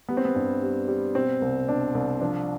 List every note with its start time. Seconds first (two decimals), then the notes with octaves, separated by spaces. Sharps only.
0.09 G3 B3
0.17 C4
0.25 B3
0.35 G2
0.62 G3
0.88 G3
1.15 B2 C4
1.42 C2
1.68 B2 D4
1.95 C2
2.21 F3 D4